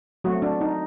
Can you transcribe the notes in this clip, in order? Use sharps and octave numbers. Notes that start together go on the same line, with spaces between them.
F#3 A3 C4 F#4
D4
D#4